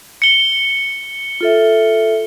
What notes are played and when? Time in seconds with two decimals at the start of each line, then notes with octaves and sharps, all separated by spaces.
0.22 C#7 G7
1.41 F4 A4 E5